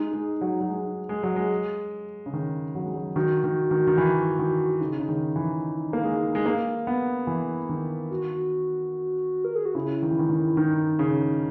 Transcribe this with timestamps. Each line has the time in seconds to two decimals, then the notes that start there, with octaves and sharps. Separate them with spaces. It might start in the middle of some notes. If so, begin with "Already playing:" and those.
Already playing: G#3 D#4
0.13 G#3
0.41 F#3
0.60 F#3
0.69 G#3
1.09 G#3
1.23 F#3
1.36 G#3
2.26 C#3
2.33 D#3
2.75 F#3
2.84 G#3
2.94 F#3
3.16 D#3 F#4
3.44 D#3
3.71 D#3
3.87 D#3
3.98 E3
4.39 D#3
4.81 C#3 D#4
4.99 C#3
5.09 D#3
5.36 E3
5.93 A#3
6.04 G#3
6.35 G#3
6.46 A#3
6.87 B3
7.27 E3
7.69 D#3
8.10 F#4
9.45 A#4
9.55 G#4
9.65 F#4
9.75 C#3 E4
10.03 D#3
10.11 E3
10.19 D#3
10.29 D#3
10.57 D#3 D#4
10.99 C#3